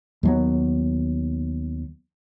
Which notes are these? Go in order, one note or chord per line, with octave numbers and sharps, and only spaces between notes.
D#2 F#3 B3